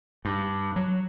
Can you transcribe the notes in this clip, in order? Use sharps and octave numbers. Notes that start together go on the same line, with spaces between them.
G2
F#3